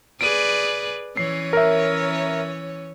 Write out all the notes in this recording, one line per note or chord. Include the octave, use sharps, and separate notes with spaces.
G#4 B4 D5 D7 D#7
E3 C#4 C#5 C7
A#4 E5